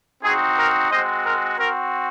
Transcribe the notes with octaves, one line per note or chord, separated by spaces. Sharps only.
C4 D#4 F#4 G#4
A#4
G#3 C4 F#4 C5 D#5
A#4
C4 F#4 A#4